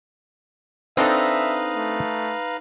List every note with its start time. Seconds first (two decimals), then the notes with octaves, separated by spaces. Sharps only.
0.97 C4 D4 D#4 A4 B4 E5 F5 A#5
1.76 A3